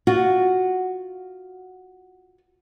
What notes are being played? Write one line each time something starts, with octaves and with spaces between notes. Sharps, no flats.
F4 F#4